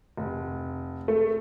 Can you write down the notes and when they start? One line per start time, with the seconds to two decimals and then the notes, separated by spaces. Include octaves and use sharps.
0.17 F1
1.08 A3